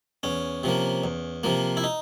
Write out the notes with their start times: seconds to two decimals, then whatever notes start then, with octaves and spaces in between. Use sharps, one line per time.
0.23 E2 C#4
0.63 C3 F3 A#3
1.04 E2
1.43 C3 F3 A#3
1.77 E4
1.84 D#4